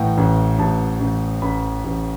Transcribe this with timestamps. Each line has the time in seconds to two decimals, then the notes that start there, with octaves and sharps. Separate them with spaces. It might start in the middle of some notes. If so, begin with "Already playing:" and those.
Already playing: A1 A2 E3 F#5 G5
0.18 A1
0.59 A1 A5
1.00 A1
1.42 A1 B5
1.85 A1